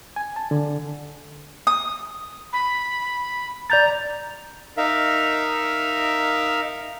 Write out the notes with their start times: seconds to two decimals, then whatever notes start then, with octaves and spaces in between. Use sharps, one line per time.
0.16 G#5
0.36 A5
0.51 D3
1.67 D#6
2.53 B5
3.70 D5 A#5 G6 A6
4.77 D#4 A#4 E5 F5